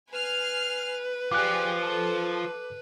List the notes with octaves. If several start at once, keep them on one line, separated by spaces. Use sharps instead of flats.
B4 G#5 F6 C7
F3 F4 G4 G#4 D5 D6 F#6
A4